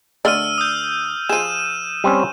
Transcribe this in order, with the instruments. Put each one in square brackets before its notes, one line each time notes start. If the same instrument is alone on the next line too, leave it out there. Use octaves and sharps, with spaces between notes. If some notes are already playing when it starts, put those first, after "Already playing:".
[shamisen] D3 A3 D5 [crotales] E6 F6 D#7
[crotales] D#6 G6
[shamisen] F3 G#4 [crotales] D#7 E7
[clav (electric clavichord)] G3 C4 C#4